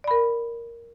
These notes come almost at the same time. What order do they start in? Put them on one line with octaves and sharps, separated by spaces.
D5 B5 A#4